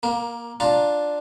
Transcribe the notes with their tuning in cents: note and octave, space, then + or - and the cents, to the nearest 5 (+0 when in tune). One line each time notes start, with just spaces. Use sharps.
A#3 +20 A#4 +0
D4 +0 F4 +10 A#5 +0